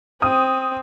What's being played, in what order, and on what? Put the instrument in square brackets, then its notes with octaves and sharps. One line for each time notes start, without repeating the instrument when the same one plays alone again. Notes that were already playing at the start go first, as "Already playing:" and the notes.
[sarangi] C4 [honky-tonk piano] D#6